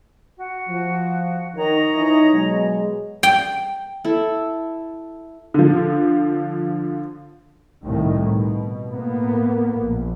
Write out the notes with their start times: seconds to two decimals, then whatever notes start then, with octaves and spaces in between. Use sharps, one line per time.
0.37 F#4
0.69 F3
1.56 D#3 C#5 D#5 A#5
1.94 E3 D#4
2.32 B2 F#3 G#3
3.23 G5
4.05 E4 A4
5.54 D3 F3
7.83 C2 A2 D#3
8.30 B2
8.87 A2 A#3 B3
9.79 A#1